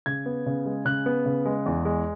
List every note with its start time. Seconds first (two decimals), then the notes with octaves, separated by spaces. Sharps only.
0.06 C#3 G#6
0.26 B3
0.46 C#3
0.66 G#3
0.85 C#3 F#6
1.06 B3
1.26 C#3
1.45 G#3
1.66 E2
1.85 G#3